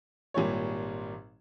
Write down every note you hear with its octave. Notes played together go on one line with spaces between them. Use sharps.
G#1 A#2 G3 G4 C#5